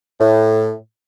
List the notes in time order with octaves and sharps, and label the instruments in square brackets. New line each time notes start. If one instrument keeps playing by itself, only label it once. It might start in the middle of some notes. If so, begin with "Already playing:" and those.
[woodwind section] A2